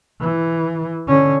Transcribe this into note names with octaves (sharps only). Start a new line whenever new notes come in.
E3
D3 C#4